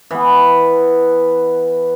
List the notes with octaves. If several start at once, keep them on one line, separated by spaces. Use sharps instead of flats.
E3 B3